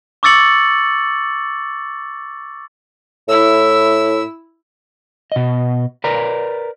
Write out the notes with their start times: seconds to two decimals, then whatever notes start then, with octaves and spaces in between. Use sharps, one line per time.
0.23 C#6 D6 E6 A6 C#7 F#7
3.28 A2 E4 E6
5.32 B2 D#5
6.04 A#4 B4 D5 A#5